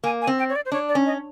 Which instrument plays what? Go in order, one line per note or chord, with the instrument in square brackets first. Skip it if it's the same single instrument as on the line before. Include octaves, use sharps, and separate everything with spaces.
[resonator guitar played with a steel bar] A#3 [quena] G#5
[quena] G#5
[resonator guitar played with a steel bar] C4
[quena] G5
C#5
D5
C5
[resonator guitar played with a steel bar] D4 [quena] C#5
[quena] D5
[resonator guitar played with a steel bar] C#4
[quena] D#5